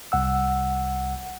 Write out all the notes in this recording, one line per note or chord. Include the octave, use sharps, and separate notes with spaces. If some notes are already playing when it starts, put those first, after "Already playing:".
C2 F#5 E6